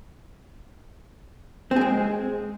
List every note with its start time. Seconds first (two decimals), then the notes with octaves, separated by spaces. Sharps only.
1.71 C4
1.76 G#4
1.81 G#3